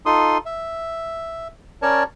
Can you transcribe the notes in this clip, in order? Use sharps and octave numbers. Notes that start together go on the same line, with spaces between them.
D#4 F4 A4 C6 D#6
E5
C#4 A#4 C#5 D5 A5